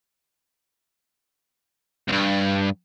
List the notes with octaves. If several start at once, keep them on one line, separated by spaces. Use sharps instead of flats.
C2 G2